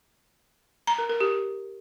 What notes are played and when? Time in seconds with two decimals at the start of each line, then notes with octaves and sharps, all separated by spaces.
0.87 A#5
0.98 A#4
1.09 A#4
1.21 G4